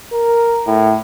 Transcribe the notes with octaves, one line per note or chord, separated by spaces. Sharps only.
A#4
A2